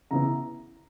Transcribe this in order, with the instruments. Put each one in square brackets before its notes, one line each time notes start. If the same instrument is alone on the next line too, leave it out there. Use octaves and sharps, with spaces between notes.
[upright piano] C#3 E3 B3 E4 A#5